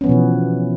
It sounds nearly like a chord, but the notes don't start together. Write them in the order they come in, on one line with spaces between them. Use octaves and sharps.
C#4 B3 F3 B2 E3